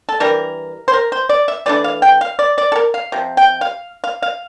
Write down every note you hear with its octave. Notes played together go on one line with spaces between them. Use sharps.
A4
E3 G3 D4 A#4
C5
A#4
C5
D5
E5
E3 A3 D4 D5
F5
G5
F5
D5
D5
A4
A#4
F5
C3 F3
G5
F5
F5
F5